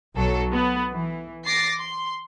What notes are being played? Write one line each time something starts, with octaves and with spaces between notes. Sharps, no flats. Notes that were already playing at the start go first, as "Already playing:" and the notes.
B1 F#3 A4
B3
E3
D6 A6 A#6 C7
C6